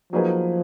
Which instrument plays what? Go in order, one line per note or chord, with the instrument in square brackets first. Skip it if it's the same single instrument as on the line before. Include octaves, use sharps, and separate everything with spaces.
[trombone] F3 [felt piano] F#3 A#3 D#4 G#4 B4